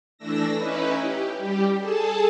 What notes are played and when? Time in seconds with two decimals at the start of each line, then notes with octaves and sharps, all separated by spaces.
0.18 E3 A3 D4 E6 A#6
0.55 C#4 D#4 E4 B4
1.00 G4
1.37 G3 G4
1.79 G#4 A4 A5